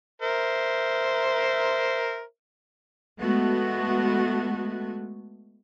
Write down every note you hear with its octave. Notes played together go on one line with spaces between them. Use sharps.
A#4 C5 E5
G#3 A3 B3 F#4